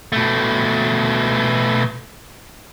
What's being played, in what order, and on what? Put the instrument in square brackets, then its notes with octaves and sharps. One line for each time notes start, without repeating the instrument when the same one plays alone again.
[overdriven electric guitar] B2 A3